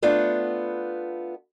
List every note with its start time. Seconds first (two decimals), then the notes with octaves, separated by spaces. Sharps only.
0.02 A3 B3 D4 F4